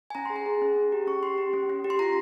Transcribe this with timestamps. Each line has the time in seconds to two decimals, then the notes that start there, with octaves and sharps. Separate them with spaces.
0.10 G#5
0.15 C#4 A#5
0.25 C6
0.30 G#4
0.36 A#5
0.46 G#4
0.62 C#4
0.76 C#4
0.92 G4
1.07 C#4 C#6
1.23 G4 C6
1.38 G4
1.53 C#4
1.70 C#4
1.84 G4
1.90 C6
1.99 F4 A#5